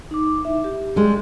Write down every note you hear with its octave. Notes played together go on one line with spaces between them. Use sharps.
D#4 D6
E4 E5
G4
G3 G#3